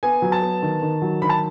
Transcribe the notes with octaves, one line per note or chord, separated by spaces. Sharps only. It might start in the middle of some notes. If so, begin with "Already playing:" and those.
B3 G#5
F#3
A5
B3
D#3
D#3
F#3
D#3 B5
A5